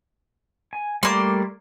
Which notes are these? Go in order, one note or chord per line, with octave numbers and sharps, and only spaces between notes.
G#5
G3 A3 A#3 D5 C6